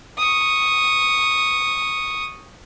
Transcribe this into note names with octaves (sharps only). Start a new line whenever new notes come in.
C#6 D#6